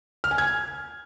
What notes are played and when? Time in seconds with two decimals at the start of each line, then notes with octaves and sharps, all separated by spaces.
0.24 F6
0.31 G#5
0.38 G#6